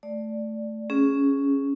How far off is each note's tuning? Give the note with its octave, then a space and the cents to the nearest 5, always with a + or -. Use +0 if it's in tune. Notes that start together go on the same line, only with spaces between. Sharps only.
A3 +0 D5 +0
C#4 +0 G#4 +0